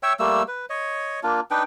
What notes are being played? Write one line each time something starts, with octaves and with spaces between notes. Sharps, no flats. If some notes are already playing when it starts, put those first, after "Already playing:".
C#5 E5 G5 E6
G3 A3 A#3 E6
B4
C#5 D#5
A#3 D4 F4
D4 D#4 B4 G5